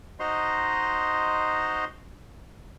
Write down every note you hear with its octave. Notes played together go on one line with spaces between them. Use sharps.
D#4 F#4 C5 D#5 A#5 C6